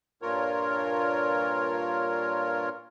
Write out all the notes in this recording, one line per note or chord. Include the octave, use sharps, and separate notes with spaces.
G2 A#2 F4 A#4 C#5